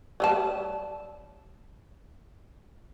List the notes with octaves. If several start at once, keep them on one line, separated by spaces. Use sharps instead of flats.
F#3 G3 A5